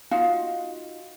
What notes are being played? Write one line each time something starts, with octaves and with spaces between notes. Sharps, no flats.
D#4 F4 F#4 F5